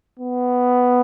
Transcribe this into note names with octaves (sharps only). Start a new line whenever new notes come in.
B3